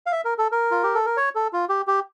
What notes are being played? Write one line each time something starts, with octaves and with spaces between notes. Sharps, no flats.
F5
E5
A#4
A4
A#4
F4
G4
A4
A#4
C#5
A4
F4
G4
G4